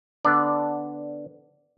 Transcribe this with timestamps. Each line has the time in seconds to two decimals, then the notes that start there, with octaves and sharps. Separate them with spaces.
0.25 D3 B3 D4 D5